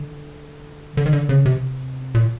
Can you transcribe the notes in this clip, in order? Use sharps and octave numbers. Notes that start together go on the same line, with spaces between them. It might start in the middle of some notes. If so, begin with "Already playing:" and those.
Already playing: D3
D3
D#3
D3
C#3
C3
A#2